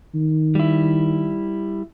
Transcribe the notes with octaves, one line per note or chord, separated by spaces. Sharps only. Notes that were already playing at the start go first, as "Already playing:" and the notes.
D#3
G3 E4